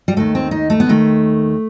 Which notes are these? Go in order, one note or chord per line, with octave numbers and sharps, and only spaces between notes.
G3
D#2 D#3 A3
C4
D#4
A3
B3
D#2 D#3 A3